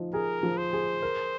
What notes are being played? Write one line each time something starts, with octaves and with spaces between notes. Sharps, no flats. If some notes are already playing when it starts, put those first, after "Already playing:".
Already playing: F3 D#4
G#4 A#4
F3
C5
G#4
A#4